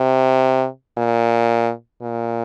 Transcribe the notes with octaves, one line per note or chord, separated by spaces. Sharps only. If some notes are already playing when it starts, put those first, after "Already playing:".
Already playing: C3
A#2
A#2